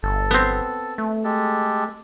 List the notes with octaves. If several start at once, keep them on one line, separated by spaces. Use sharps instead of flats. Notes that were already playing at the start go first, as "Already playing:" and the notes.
G1 A4
B3 C4
A3
G#3 G4 A4